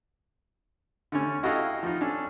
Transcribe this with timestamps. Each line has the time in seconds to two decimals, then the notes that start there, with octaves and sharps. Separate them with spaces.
1.12 D3 A3 C#4
1.43 E4 F#4 A4 D#5 F5 G5
1.83 F3 D#4
2.01 C#4 D4 A4